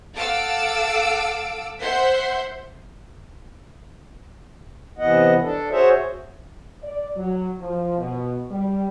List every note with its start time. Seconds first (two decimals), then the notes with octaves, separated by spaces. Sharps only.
0.14 A4 F5 F#5 D6 E6 D7
1.80 C5 E5 F#5 C6 G6
4.98 C3 E3 B3 D#5 F#5
5.42 D4 A4
5.71 F#4 G#4 C5 C#5 E5
6.81 D5
7.16 F#3
7.60 F3
7.98 B2
8.51 G3